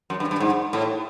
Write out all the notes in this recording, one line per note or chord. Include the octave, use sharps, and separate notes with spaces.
F#2
G2
G2
G#2
A2